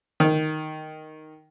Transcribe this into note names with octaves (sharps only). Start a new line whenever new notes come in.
D#3